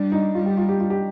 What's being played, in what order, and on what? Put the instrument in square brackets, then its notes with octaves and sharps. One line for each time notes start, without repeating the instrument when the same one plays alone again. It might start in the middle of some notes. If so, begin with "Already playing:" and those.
Already playing: [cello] G3 [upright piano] D4
[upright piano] D#4
[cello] G3 [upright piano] F4
[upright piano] G4
F4
G4
F4
G4